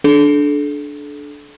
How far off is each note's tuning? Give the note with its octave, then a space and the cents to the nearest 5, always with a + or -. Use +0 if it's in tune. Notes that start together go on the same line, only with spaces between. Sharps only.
D4 +0 A4 -35